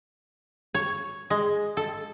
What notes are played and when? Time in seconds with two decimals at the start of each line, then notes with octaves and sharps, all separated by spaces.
0.74 C#5
1.30 G#3
1.77 A4